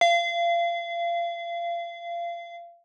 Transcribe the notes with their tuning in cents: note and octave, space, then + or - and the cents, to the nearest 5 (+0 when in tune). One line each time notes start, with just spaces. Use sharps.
F5 -30